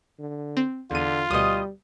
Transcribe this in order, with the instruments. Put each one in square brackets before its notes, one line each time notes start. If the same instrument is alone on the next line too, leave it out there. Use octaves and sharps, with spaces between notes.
[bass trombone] D3
[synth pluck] C4
[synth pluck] E2 D#7 [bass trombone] D3 [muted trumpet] F4
[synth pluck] D2 B2 [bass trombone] G3 [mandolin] D#5 D#6